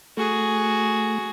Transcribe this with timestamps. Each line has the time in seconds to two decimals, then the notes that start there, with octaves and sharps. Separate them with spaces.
0.17 A3 F#4 G#4